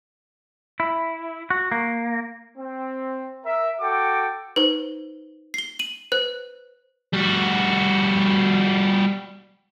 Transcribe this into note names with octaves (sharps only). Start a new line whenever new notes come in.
E4
F#4
A#3
C4
A#4 E5
F#4 A4 G5 D6
D#4 B4 C5
C7 G7
D#7 F#7
B4 C5 F#6
G3 F#4